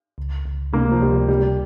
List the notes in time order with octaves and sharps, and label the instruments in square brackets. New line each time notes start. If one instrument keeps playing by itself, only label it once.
[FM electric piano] C#2
C#2
[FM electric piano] C3 [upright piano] A#3
[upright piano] F3
[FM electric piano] C#2 [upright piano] G3
[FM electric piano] C3 [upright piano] G3